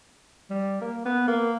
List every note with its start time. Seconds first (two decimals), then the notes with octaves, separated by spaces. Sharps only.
0.50 G3
0.81 A#3
1.05 B3
1.28 A#3